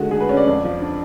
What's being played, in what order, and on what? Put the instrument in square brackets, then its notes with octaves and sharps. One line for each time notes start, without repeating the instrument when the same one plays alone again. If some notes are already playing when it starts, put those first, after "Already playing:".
Already playing: [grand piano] D3 G#3 A3 F#4
D3 G#4
B4
C#4
D5
F2
F3
D4